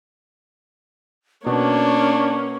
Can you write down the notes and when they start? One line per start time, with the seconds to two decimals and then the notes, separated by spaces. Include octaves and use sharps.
1.46 B2 A#3 C#4 D4 C#6